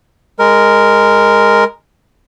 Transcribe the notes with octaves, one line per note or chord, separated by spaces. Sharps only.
G#3 A#4